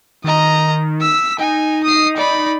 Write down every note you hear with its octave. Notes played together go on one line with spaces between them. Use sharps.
D#3 D#5 A#5
E6 B6
D#4 G#5
D#6 C7
D5 B5